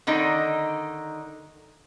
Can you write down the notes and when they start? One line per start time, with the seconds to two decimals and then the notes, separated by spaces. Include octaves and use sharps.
0.07 D3 D#3 D#4